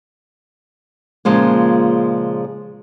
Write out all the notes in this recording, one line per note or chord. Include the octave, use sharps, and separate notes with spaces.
A#2 C#3 F3 G#3 A#3